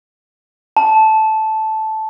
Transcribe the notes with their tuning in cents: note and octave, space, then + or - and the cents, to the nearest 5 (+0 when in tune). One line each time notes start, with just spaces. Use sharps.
A5 -10